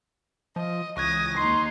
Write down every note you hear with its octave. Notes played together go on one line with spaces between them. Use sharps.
F3 D#5
C#2 E3 C#6 D#6 F#6 G#6 A#6
D#2 D#4 C6 C7